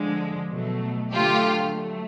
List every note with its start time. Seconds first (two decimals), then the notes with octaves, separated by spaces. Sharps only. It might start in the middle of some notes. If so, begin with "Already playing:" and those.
Already playing: D3 F3 G#3
0.49 B2 F#3 A3
1.11 D3 F#3 A3 F4 G4
1.75 F#3 A3